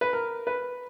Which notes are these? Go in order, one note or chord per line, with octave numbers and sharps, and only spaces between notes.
B4
A#4
B4